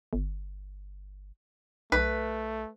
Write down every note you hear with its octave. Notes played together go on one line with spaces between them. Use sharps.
G1
B1 A3 B4